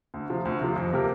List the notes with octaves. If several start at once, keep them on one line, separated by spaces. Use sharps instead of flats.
D2
C3 F3
D2
C3 F3
F2
C3 A#3 G4 A#4